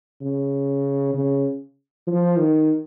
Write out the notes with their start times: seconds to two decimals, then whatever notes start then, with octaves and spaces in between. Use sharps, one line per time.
0.21 C#3
1.14 C#3
2.07 F3
2.38 D#3